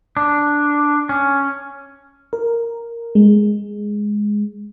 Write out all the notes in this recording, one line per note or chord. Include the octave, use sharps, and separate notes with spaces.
D4
C#4
A#4
G#3